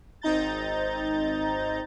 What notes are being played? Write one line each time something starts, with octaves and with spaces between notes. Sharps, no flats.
G#1 C4 D#4 A#5 G6 A6